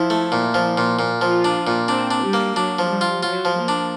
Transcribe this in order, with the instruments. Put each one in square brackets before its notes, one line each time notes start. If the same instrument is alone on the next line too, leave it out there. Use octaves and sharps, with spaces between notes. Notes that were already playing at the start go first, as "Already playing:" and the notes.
Already playing: [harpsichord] F3 [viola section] E4
[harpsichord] A3
A#2
F3
A#2
A#2
[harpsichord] F3 [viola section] F4
[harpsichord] D4
A#2
[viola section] C4 [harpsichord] D4
[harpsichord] D4
[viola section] G3
[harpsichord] A#3
[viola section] F#3 [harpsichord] D4
[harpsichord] F3
[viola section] G3
[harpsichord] F4
[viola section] F#3 [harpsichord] F4
[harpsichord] F3
[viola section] A#3
[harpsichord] D4